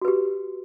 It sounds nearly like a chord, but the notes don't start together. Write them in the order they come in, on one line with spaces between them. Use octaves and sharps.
F#4 B4 G4